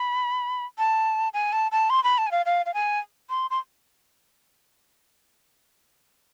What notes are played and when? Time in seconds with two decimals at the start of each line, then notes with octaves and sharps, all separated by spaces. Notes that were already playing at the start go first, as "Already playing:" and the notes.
Already playing: B5
0.78 A5
1.34 G#5
1.52 A5
1.72 A5
1.90 C6
2.04 B5
2.18 A5
2.27 G#5
2.31 F5
2.46 F5
2.66 F5
2.74 G#5
3.30 C6
3.50 C6